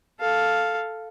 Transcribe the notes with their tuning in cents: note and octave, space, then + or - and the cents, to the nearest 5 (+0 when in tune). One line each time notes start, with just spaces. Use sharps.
A4 +0 F5 +0